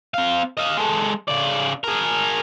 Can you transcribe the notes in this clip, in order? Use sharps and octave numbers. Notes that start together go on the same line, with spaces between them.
C4 F5
D#5 F5
G#3 A4
C#3 D5
G#4 A#4